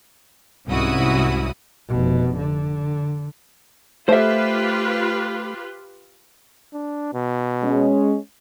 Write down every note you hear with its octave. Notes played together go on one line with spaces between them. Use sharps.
C2 G#2 C#4 E4 F#4 D#6
F1 B2
D3
A3 F4 G4 B4 C5 E5
D4
B2
G#3 C#4